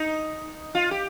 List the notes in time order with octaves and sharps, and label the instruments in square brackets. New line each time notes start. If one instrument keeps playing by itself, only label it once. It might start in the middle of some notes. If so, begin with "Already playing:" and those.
Already playing: [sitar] D#4
F4
G4